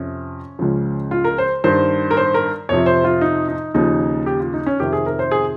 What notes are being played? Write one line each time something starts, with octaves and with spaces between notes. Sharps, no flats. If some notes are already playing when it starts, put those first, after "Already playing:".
Already playing: F2 C3 F3 C#4
C#2 C#3 F3
F4
A#4
C5
G2 D#3 C5
A#4
C5
A#4
F2 C3 F3 C#5
C5
F4
D#4
D#4
D#2 C#3 F3 D#4
G4
F4
D#4
C#4
F2 C3 D#3 G4
G#4
A#4
C5
G#4